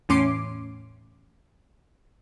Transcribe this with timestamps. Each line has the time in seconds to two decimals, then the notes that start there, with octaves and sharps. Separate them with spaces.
0.09 E2 A2 C#4 C6 D6 C7